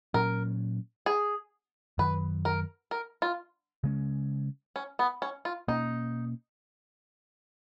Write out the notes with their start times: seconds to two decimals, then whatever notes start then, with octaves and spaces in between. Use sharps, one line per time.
0.14 A#2 F#3 C#4 A#4
1.06 G#4
1.98 F#2 D#3 F#3 B4
2.45 A#4
2.91 A#4
3.22 F4
3.84 C#3 G#3 C#4
4.76 C#4
4.99 B3
5.22 C#4
5.45 F4
5.68 B2 A#3 C#4 D#4